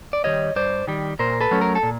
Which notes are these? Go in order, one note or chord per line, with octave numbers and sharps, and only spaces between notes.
D5
D#3 G3 C#5 D#5
G2 C5 D5
D#3 G3
A#2 A#4 C5
A4 B4
F#3 A3 C#4
A#4
A4
A#2